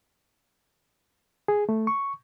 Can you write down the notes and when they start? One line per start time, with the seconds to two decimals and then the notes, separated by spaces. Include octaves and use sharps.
1.48 G#4
1.69 A3
1.87 C#6